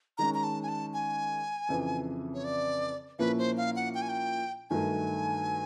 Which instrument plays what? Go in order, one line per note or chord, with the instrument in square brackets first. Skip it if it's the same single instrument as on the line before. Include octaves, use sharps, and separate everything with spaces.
[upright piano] D#3 G#3 C#4 [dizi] A#5
[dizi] A#5
A5
G#5
A5
G#5
[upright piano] F2 C#3 E3
[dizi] C#5
D5
[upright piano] A#2 F3 A#3 C#4 E4 [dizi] B4
[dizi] C5
F5
F#5
G5
G#5
G5
[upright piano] G2 D#3 F#3 A3 [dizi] G#5